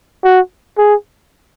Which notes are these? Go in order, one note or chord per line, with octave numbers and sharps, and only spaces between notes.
F#4
G#4